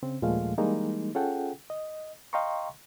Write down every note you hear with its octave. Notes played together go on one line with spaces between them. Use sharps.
C#3 C4
D#2 A#2 F3 G#3 A3 F5
E3 G3 G#3 A#3 D#4
C#4 F4 G#4 A4 F#5 G5
D#5
D#5 F5 G5 A#5 C6 C#6